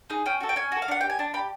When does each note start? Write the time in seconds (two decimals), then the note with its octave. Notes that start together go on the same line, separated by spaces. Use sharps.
0.10 D#4 G#4
0.26 C#4 G5
0.41 F#4 A4
0.49 G5
0.56 C#4 G#5
0.72 F#4 A4
0.82 F5
0.88 D4 F#5
1.01 G4 G5
1.10 G#5
1.19 D4 A5
1.34 G4 B5